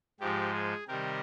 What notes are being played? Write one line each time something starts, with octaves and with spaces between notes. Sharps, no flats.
G#2 F3 G#3 G4
G#4
C3 D#3 G3 G4 A#4